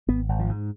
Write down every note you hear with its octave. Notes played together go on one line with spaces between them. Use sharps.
G#1 B3
G#1
F3
G#2